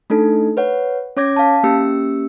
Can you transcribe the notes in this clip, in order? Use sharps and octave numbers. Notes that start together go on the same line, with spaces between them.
A3 D4 D#4 A4
B4 C#5 F#5
C#4 C#5 D6 G#6 A#6
F5 A5
A#3 C#4 G4 E6 C#7